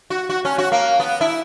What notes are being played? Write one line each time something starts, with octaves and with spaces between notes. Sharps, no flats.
F#4
F#4
C#4
F#4
A#3
B3
E4